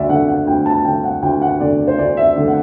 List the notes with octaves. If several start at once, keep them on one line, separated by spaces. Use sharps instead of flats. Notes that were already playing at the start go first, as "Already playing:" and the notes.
Already playing: D2 D5 E5
D3 F#5
F#5
D2 G5
A5
D3 G5
F#5
D2 G5
F#5
D3 D5
C5
D2 D5
E5
D3
F#5